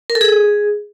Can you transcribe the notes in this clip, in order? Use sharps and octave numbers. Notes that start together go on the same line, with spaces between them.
A#4
A4
G#4